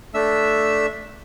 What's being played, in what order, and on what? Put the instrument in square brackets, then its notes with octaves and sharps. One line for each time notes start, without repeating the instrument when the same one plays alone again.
[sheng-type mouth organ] A3 D4 E5 E6